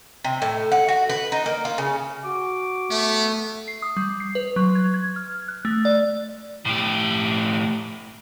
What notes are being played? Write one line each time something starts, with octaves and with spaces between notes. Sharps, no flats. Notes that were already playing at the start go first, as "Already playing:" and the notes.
C3
A2
F#5
F#4
B4
D#4
A#3
F4
C#3
F#4 D6
A3 B3
C7
D#6
G3
C7
B4
F#3
G#6
G#6
F6
F#6
A3
D5
A2 G4